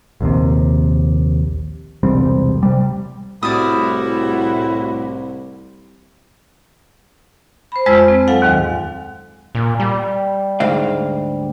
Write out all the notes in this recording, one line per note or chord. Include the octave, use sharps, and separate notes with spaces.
A#1 D#2 C3
E1 C2 G3 C4
C3 G3
C2 A2 G3 E4 F#4 D5 D#6
C5 B5
F2 G#3 F4 C5 E6
C4
F#3 A4 F5 F#5 G#5
D#2 G#2 D#3
A#2
G3
D2 G#2 F5